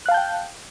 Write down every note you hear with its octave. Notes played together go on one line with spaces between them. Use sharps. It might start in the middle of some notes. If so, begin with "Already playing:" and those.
F5 G5 A5 F#6 G6